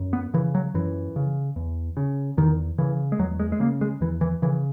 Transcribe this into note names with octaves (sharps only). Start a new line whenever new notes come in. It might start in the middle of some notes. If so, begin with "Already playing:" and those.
Already playing: F#2
B3
C#3 E3
F#3
F#2 E3
C#3
E2
C#3
E2 D#3
C#3 E3
G#3
E2 F#3
G#3
G#3
C#3 A#3
G#3
E2 E3
E3
C#3 E3